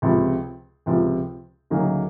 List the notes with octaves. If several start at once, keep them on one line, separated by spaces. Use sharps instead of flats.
C#2 C3 F3
C#2 C3 F3
D2 C#3 F#3 A#3 D#4